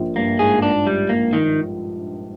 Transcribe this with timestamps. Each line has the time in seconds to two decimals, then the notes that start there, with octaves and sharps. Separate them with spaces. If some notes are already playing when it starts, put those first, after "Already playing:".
Already playing: A#1 A#2
0.16 G2 A#3
0.39 G#2 G#4
0.62 D4
0.87 G3
1.09 A#3
1.33 D#3